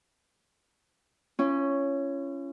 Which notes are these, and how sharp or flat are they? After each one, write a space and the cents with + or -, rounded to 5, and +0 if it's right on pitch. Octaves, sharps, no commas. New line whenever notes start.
C#4 +0 F4 -45